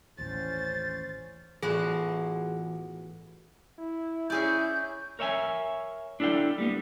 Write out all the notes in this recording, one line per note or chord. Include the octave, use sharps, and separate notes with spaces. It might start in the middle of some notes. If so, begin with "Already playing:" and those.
A1 D#2 C#4 C5 A6
A2 E3 B3 F4 F#4 G#4 D5
E4
C#4 E4 G#4 D5 G6
A#4 C#5 E5 G5 G#5
D4 E4 A4 F5 G5
G3 A#3 B3